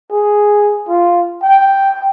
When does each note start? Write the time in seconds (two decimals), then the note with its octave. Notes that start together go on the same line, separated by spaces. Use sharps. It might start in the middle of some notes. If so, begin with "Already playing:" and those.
0.11 G#4
0.88 F4
1.43 G5